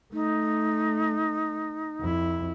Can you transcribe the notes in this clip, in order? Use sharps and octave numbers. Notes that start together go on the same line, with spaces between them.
A3 D#4
F2 E4